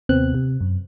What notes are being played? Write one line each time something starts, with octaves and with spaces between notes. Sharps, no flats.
D#2 C3 B3 C4 F#6
C3
F#2